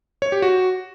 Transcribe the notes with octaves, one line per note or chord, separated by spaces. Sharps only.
C#5
G4
F#4